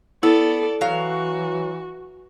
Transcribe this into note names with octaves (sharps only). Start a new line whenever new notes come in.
B3 E4 A4 D5
E3 F#3 F#4 F5